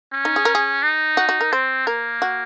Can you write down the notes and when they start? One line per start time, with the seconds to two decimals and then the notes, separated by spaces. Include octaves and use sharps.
0.13 C#4
0.25 D#4
0.36 G#4
0.45 A#4
0.55 G#4
0.83 D#4
1.17 F#4
1.29 F#4
1.41 A#4
1.53 C4 C5
1.87 A#3 A#4
2.22 F#4